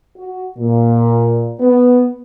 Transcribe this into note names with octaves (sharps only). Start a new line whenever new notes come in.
F#4
A#2
B3